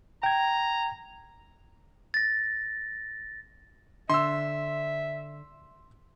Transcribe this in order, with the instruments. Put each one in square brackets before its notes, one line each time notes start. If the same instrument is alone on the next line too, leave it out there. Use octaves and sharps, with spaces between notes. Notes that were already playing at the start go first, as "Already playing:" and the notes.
[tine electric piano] G5 G#6 [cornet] A#5
[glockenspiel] A6 A#6
[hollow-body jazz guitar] D3 [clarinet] E5 [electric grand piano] C6 E6